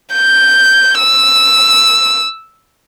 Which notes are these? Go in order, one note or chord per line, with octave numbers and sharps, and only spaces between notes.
G6
E6